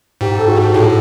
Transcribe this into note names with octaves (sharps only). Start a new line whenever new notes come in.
G#2 G4
A4
F#4 G#4
A2 G4 A4